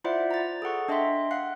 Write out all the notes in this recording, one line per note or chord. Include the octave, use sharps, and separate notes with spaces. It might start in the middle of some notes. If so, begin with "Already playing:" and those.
E4 F4 C5 D5 E5 F#5
A#5 A6
G#4 A4 F#5 C#6
D4 D#5 E5 G5 C6 B6
F5 F#5 F#6